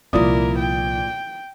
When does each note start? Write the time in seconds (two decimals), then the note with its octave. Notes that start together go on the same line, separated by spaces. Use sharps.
0.13 C2 A#2 F3 E4 A#4 D5 D#6
0.59 G5